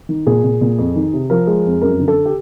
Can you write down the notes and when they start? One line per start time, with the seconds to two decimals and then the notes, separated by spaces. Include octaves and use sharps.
0.09 D#3
0.26 A#2 G#4
0.44 A#2
0.61 A#2
0.78 F2
0.96 D#3
1.13 C3
1.30 F3 A#4
1.47 G#3
1.65 F2
1.82 F#2 A#4
2.00 D3
2.08 A4
2.25 G4